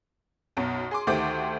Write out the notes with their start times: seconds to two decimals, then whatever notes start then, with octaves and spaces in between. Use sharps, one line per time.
0.57 B1 F#2 B2
0.91 G#4 C6 D6
1.07 D2 D#3 A3 G4 C5 D6